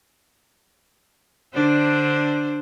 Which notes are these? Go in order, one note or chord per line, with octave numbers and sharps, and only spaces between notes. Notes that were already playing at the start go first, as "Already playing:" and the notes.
D3 D4 C5